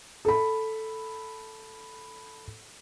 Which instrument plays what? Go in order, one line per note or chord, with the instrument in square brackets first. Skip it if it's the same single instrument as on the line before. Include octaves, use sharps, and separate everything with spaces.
[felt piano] A4 B5